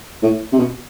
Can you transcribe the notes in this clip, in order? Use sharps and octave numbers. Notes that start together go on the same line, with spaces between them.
A2
C3
B2